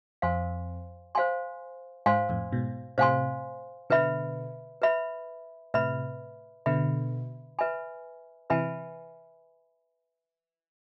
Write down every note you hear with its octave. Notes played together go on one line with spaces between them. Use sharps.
F2 C5 F5 G#5 C6
C5 F5 G#5 C6
G#2 C5 F5 G#5 C6
F2 A2
G#2 B2
A2 C3 C5 F5 G#5 C6
B2 D3 B4 E5 B5
B4 E5 B5
A2 C3 B4 E5 B5
B2 D3 B4 E5 B5
B4 E5 G#5 B5
C3 E3 B4 E5 G#5 B5